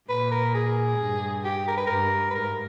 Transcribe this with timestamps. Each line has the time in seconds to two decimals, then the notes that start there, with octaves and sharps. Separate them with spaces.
0.09 A#2 B4
0.32 A#4
0.54 G#4
1.00 G2
1.44 G4
1.68 A#4
1.77 B4
1.87 G2 A#4
2.30 B4
2.35 G#2 A#4